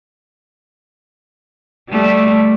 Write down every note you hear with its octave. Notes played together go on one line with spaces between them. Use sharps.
G3 A3